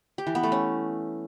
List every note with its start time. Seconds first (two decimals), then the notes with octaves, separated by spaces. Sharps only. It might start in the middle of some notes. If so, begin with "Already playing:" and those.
0.18 G4
0.27 E3
0.35 B3
0.43 A3
0.52 C#4